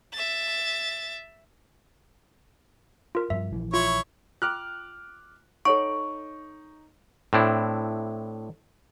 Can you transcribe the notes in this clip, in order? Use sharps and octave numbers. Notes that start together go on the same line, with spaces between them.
E5 A6
F4 A#4
G2 F3 E5
A#1 E3 F3
E4 F4 C#5
F4 G5 D6 F6 F#6
D#4 A4 C#5 F#5 C#6 D7
A2 C4 D4 E4